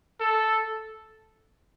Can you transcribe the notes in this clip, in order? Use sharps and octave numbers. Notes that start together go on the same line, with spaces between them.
A4